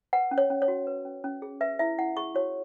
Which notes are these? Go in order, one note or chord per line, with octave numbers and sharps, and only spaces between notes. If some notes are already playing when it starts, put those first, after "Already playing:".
B4 F#5
C#4
C#5
C#4
C#5
F#4
B4
C#4
C#4
G#4
B4 E5
E4 E5
E4 F#5
G#4 C#6
F#4 C#5